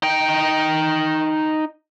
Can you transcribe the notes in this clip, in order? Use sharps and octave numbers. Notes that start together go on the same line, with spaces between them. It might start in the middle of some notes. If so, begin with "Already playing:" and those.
D#4 G5